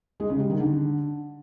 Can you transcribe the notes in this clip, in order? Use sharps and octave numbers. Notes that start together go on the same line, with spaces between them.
G#3
C#3
G3
D#3
D3